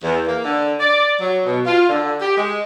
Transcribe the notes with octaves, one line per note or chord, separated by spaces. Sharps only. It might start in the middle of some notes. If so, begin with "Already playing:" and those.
E2
A#3
D3
D5
F#3
B2
F4
D3
G4
G#3